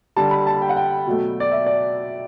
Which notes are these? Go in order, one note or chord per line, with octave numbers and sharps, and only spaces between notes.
D3 G3 A5
B5
A5
G5
F#5
G5
B2 F#3 A3
D5
E5
D5